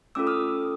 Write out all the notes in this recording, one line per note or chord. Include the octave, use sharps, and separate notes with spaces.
A3 C#4 F4 A4 D6 E6
D#6 F6